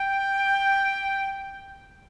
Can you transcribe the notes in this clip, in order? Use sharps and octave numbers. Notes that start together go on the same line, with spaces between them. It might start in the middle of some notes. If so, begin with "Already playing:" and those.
Already playing: G5